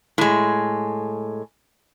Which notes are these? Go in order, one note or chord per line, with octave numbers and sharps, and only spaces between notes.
A2 G#3